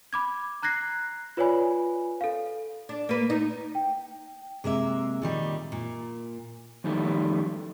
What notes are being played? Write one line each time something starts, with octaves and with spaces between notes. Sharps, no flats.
B5 D6 G#6
A#5 F#6 G#6 A#6 C7
F4 B4 C#5 D5 G#5 B5
A4 F5
D4
A#3 B4
D#4
G5
C3 G#3 A#3 E5
A#2 D#3 G3
A#2
F2 D#3 F#3 G3 A3 E4